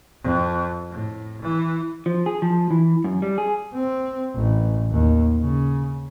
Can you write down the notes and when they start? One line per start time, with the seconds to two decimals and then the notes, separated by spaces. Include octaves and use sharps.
0.23 F2
0.90 A2
1.41 E3
2.06 F3
2.26 G#4
2.42 F3
2.71 E3
3.04 F#2
3.22 G3
3.38 G#4
3.74 C4
4.36 A1
4.91 D#2
5.40 C#3